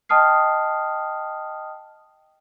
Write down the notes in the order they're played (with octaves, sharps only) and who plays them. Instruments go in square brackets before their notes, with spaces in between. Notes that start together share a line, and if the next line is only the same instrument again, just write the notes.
[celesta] D#5 G5 A5 D#6 F6 C7